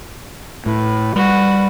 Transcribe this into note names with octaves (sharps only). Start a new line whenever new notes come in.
A2 B4
G3 F#4 B4